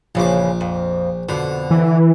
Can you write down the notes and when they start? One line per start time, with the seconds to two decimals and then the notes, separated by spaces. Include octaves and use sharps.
0.15 A#1 C#3 E3 F3 D6
0.61 F2
1.29 F2 B2 D3
1.71 E3